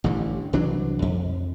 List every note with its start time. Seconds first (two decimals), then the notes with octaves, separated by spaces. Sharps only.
0.04 A1 G2 D3
0.53 C2 E3 F#3 D4
1.02 F2